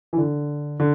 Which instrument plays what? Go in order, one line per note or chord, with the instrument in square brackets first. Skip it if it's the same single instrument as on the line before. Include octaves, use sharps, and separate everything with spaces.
[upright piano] E3
D3
D3